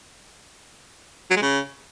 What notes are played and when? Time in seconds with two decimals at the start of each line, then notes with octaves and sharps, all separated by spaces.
1.30 F#3
1.36 G#3
1.42 C#3